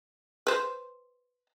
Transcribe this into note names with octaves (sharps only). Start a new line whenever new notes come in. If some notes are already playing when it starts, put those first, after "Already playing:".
B4 C5